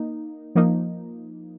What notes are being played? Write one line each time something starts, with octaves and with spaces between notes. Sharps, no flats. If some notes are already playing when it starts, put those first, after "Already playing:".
Already playing: A#3 D#4
F3 A#3 D#4